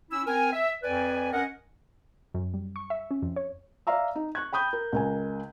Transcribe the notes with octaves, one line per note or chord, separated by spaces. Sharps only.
C#4 E4 E6
C4 A#4 G#5
E5
F2 B4 D5 G#5
C#4 A#4 D#5 F#5
F#2
G3
C#6
E5
C#4
F2
C#5
D5 E5 F5 A#5 E6
D#4
C#6 F#6 G#6
G5 B5 D#6 G6
A#4
C#2 A#4 G#5